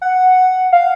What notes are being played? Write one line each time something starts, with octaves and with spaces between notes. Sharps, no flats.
F#5
F5